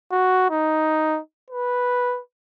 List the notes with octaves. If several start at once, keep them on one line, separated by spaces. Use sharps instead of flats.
F#4
D#4
B4